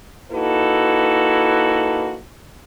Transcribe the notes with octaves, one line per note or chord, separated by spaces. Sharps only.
A#3 D#4 E4 F#4 A4 B4